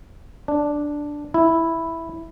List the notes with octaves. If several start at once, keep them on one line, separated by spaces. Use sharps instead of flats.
D4
E4